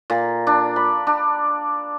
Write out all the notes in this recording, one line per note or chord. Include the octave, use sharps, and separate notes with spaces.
A#2
D4
B5
D4